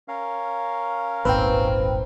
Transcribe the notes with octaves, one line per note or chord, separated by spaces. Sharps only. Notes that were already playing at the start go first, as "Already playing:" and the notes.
C#4 A#4 F5
D#1 G#1 C4 B4 G5